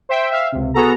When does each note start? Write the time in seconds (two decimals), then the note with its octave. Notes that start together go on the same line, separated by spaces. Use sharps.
0.09 C5 E5 G5
0.31 E5 F5
0.52 C#2 C3
0.74 B3 F#4 G#4 A4 A#5